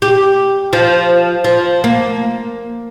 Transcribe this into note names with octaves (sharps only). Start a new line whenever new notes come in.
G4
F3
F3
A#3